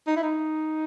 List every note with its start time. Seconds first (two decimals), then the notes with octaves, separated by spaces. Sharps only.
0.07 D#4
0.16 E4
0.23 D#4